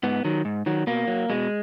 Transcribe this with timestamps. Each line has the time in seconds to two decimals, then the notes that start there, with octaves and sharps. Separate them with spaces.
0.03 G#2 B3
0.25 D#3 F#3
0.45 G#2
0.66 D#3 F#3
0.87 B2 A#3
1.08 F#3
1.30 B2 G#3